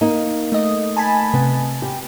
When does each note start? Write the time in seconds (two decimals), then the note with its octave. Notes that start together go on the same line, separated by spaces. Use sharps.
0.01 A#3 D#4
0.52 A3 D#5
0.97 G#5 A5 B5
1.34 C3 B3
1.82 G4